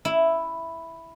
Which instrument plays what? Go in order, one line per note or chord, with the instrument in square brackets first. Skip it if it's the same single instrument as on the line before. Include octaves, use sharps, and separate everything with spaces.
[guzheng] E4